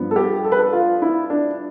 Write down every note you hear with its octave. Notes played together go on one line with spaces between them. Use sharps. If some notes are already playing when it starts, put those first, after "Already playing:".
Already playing: G2 F3 B3
A4
G4
A4
B4
A4
F4
E4
D4